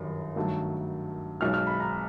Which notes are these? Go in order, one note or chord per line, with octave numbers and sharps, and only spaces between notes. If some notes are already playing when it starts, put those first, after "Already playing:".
Already playing: G1 F#2 D#3 G3
G2 D#3 F#3 A3
B1 B2 G#3 F6
F6
B5
A#5